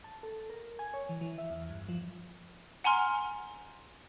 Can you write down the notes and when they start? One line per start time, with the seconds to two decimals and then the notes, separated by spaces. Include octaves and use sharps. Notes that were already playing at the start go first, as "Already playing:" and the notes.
0.04 A5
0.23 A4
0.50 A#4
0.79 G#5
0.94 C#5
1.09 E3
1.21 E3
1.38 E5
1.50 E2
1.70 G2
1.88 F3
2.84 F#5 G#5 A#5 C6 F6